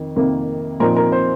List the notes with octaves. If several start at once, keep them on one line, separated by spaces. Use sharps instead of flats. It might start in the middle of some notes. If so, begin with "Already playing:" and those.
Already playing: F2 D#3
F2 C3 D#3 A#3
A#2 F3 C4 D#4 A#4
A#4
C5